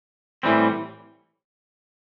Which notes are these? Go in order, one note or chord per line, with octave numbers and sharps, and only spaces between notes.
A2 E3 G3 C4